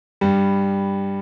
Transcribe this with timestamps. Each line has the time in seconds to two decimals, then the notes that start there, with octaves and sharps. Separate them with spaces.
0.21 G2 G3